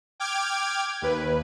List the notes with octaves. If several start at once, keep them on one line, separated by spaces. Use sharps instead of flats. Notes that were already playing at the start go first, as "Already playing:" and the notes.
G5 D6 F6 G#6
D#2 B4